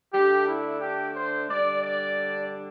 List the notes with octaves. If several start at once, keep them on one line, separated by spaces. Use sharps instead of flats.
D3 A3 D4 G4
E4
G4
C5
D3 G3 D4 D5
D5